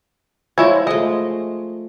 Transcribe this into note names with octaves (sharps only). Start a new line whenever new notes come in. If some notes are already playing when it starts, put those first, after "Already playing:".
F3 G#3 E4 C#5
G#3 A3 D#5